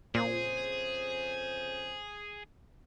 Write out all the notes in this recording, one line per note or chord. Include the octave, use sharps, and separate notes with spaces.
F2 A#2 C#3 G#4 C5